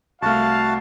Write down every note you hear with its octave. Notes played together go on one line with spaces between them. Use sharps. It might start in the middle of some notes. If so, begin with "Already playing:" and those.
C2 A3 F#4 F5 A5